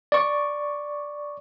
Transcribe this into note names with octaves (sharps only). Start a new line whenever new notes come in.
D5 C#6